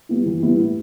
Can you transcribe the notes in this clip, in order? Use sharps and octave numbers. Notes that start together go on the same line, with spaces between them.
G3 B3 E4
E3
G3 B3 E4
A2